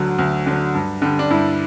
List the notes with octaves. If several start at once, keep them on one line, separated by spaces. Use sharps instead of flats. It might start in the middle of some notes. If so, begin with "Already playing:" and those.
Already playing: D2 D3 F#3
D2
D3 F#3
G2
D3 G3
D4
G2 E4